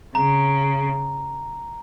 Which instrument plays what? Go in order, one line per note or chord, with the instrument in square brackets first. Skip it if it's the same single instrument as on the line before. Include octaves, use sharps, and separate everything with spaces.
[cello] C#3 [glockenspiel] A#5